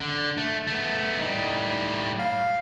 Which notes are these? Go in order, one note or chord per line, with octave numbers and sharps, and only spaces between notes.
D3
A3
A3 B3
A2 G3 D#4
F5